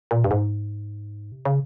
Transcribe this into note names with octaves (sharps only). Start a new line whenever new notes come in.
A#2
G2
G#2
C3
C#3